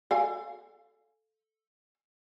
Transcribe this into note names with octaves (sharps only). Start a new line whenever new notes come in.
A4 F5 G#5